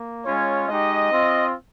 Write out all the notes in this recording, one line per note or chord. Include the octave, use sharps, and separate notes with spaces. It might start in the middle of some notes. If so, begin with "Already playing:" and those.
Already playing: A#3
G#3 C#4 F4 C#5
G#3 D#4 G4 D#5
C4 F4